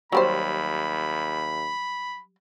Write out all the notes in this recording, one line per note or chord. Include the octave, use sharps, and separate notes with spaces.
D#2 F#3 G3 C5 B5